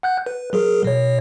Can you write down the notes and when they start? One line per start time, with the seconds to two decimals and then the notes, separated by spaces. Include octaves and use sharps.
0.03 F#5 F#6 G6
0.26 B4
0.53 F#3 G#4 A#4
0.84 B2 C#5